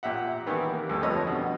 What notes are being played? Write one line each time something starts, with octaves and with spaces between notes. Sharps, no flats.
A#2 G4 E5 F#5
D#3 E3 G3 B3 B4
C3 A#3
D2 G2 G4 A4
F2 C3 B4 C#5 D#5
B2 D3